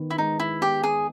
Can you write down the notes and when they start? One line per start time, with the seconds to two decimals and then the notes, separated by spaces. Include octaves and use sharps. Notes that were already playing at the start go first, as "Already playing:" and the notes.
Already playing: D#3 B3
0.10 E4
0.18 G#3 D#4
0.40 E4
0.62 B3 G4
0.83 G#4